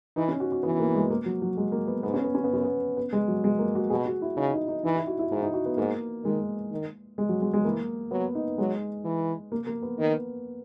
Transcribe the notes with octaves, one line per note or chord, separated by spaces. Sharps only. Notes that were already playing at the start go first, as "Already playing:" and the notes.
E3 D#4
C#4
F#4
F#4
E3 B3
A#3
G#3
A#3
F#3
F#3
G#3
A#3
B3
G#2 B3
C#4
B3
C#4
B3
F#2 C#4
B3
B3
G#3
F#3
G#3
A#3
F#4
B2 G#4
F#4
E4
C#3 D#4
D#4
D#4
E3 D#4
E4
F#4
E4
G#2 D#4
D#4
F#4
B3
G#2 A#3
D#3 G#3
D#3
G#3
F#3
G#3
G#3
E3 A#3
F#3 B3
D#4
F#3 G#3
E3
A#3
A#3
B3
D#3